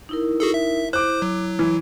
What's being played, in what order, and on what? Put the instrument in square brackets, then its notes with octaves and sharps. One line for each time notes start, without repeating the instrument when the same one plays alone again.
[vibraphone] D#4 E4 A#4
[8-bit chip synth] F#4 G#4 A4
E5
[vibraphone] E4 [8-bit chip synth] C5 [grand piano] D6 F#6
[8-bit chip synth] F#3
[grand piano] E3